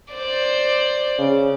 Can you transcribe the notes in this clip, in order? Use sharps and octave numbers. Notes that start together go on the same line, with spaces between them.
C5 D5
C#3